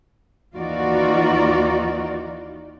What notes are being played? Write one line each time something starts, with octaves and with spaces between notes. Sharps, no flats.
D#2 E3 D#4 F4 F#4 D5